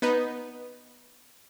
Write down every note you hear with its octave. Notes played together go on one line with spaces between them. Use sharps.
B3 D#4 B4